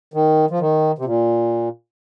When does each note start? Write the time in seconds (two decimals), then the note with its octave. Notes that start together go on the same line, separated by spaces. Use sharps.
0.14 D#3
0.50 F3
0.60 D#3
0.99 C3
1.05 A#2